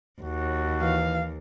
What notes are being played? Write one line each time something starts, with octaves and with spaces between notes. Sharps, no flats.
D#2 F#4
E3 F5